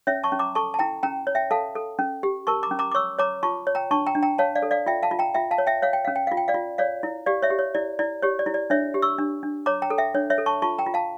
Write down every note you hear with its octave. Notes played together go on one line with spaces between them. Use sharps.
C#4 C#5 E5
A5 C#6
C#4
A#5 D6
A4 A5 C#6
A5
E4 G5 A#5
C#4 G5 A#5
C#5
E5 G5
A4 F5 A5
A4
C#4
G4
A#4 A5 C#6
A#5 D6
C#4
A#5 D6
D6
C#5 C#6 E6
C#5 A#5 D6
F4 A5 C#6
C#5
G5 A#5
D4 A5 C#6
G5 A#5
D4
G5 A#5
C#5 F5 A5
D5 F5
A4
D5 F5
F4 E5 G5
F5 A5
F4
G5 A#5
F4 E5 G5
F5 A5
C#5
E5 G5
C#5 F5
G5
C#4 F5
G5
F4 F5
G5
D5 F5
F4
C#5 D5 F5
E4
G4 D5 F5
C#5 E5
G4
C#5
E4 D5
E4 D5
G4 C#5
D5
E4
D5
D4 C#5 E5
G4
C#6 E6
D4
D4
C#5 A#5 D6
G5 A#5
A4
E5 G5
D4 C#5
C#5 E5
A4
A5 C#6
F4 A5 C#6
G5 A#5
F4
F5 A5